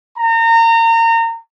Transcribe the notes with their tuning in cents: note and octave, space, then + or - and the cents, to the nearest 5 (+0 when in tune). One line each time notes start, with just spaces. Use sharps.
A#5 -30